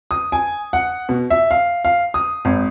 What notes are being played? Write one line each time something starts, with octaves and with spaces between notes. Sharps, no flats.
D#6
G#5
F#5
B2
E5
F5
F5
D#6
G#1